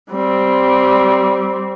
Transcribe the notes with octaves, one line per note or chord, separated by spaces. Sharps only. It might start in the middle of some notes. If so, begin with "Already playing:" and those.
G3 C4